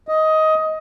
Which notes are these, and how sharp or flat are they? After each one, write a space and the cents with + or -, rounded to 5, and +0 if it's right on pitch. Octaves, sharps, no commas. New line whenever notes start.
D#5 +15